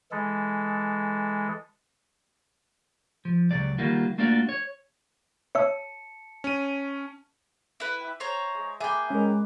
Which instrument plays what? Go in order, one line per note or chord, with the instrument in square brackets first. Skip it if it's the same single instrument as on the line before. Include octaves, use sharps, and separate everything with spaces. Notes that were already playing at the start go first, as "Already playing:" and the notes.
[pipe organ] E3 G#3 A4
[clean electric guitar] F3
C#2 F#3 D5
D#3 G3 A#3 F4 F#4
A3 A#3 D4 F4 F#4 D5
C#5
[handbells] C#5 E5 E6 [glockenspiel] A5 C#7
[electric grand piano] C#4 D#7
[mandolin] E4 B4
[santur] E5 G5
[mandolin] C5 C#5 A#5
[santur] G#3
[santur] A#3 B4 D6 [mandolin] G#4 G5 [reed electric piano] E5
[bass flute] G#3 [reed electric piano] C#4 A#4